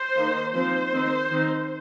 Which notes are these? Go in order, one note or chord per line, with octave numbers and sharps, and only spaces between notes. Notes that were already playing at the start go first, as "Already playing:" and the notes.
Already playing: C5
D#3 A#3 D#4
F3 C4 D#4 C5
D#3 C4 D#4
D#3 C4 D#4